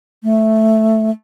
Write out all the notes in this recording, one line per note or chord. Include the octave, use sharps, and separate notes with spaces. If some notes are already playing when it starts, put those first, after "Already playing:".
A3